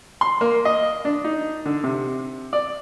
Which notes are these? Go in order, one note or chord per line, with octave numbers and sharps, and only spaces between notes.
C6
A#3
D#5
D4
D#4
D3
C3
D5